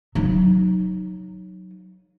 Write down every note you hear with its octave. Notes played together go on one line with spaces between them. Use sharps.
F#3 D#4